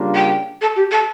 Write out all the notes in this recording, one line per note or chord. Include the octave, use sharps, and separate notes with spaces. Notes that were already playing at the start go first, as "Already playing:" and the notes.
Already playing: C#3 G3 A#3 D4 F4
G5
A4
G4
A4